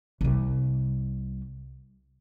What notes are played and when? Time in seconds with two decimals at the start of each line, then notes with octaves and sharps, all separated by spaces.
0.21 C2 G3